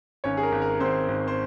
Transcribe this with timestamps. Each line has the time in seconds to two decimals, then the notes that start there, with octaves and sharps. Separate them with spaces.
0.24 G#1 C#4 C#5
0.37 G#4
0.43 A#4
0.52 G#1
0.62 A#4
0.80 G#1 C4 C5
1.08 G#1
1.28 C5